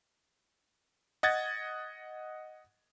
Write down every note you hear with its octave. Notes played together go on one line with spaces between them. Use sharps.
D#5 F#5 G#6 A6